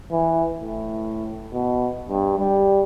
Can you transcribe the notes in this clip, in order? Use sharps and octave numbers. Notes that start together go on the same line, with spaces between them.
E3
A2
B2
G2
G3